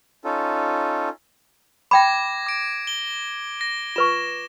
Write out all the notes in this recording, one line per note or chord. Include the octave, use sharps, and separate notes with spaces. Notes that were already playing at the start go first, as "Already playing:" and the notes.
C#4 D#4 F4 A4
G5 B5 D6 G#6 A#6
D6 D7
G7
A#6
F4 B4 C#6 E7